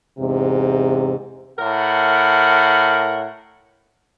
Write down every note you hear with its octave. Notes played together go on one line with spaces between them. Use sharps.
E2 G#2 C3
A2 A#4 F#5